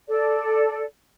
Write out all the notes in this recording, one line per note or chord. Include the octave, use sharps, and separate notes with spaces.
A4 D5